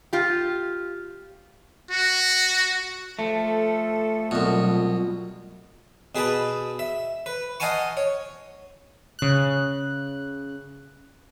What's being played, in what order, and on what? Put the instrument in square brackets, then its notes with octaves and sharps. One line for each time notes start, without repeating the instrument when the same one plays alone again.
[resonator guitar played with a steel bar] F4 G4
[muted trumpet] F#4
[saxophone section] F3 A4 [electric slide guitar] A3
[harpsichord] C2 B2 [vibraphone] F#3 F4
[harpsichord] B2 G#4 B4 A5 B5
E5
B4
D#5 F5 F#5 G#5 A5 C#6
C#5
[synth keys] C#3 F#6